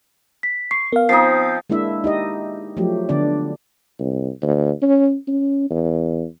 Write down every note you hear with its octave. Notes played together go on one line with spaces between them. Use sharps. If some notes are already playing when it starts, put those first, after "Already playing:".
B6
C#6 C7
B3 A#4 F5
F3 C4 D#4 D#6 C7
G#3 A#3 D4 E4 E5
D#4 G4 D#5
F3 F#3 A3 G4
D3 B3 D4 D5
C2
D2
C#4
C#4
E2